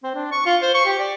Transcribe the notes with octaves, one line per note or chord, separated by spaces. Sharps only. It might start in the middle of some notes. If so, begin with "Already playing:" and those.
C4
D4
C#6
F4
C5
C#6
G4
D5